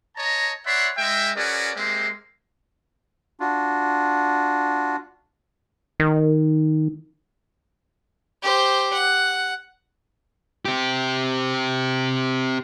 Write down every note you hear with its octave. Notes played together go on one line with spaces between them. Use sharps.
C#5 D#5 A5 A#5
C#5 D5 E5 F#5 B5 C6
G#3 E5 G5
C#4 F#4 G#4 A#4 B4 D5
G#3 A#3 C4 G4 E5 C6
D4 F4 F#4
D#3
G4 C5
F#5
C4 G4